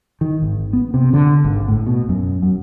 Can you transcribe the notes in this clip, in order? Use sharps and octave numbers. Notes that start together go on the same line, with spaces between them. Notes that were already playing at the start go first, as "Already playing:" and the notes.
D#3
G#1
B3
C3
D3
G#1
A2
B2
F#2
F#2